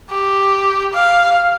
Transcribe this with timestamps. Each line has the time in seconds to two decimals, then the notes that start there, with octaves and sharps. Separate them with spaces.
0.10 G4
0.93 F5